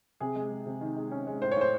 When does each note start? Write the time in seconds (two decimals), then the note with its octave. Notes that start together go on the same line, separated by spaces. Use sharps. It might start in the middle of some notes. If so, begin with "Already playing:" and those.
0.20 C3 G#4
0.36 G#3
0.51 G#3
0.66 C3
0.81 D#3
0.97 G#3
1.11 C#4
1.27 G#3
1.42 A2 C5
1.51 C#5
1.57 A2 C5